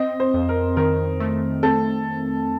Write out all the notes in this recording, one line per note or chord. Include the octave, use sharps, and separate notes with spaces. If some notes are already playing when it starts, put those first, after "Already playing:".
Already playing: C4 D#5
C5
F2
A#4
D#3 A#4
A3
C4 A4